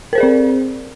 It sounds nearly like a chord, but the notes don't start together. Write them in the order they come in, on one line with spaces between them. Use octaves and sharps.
A#4 C5 G#4 D5 C4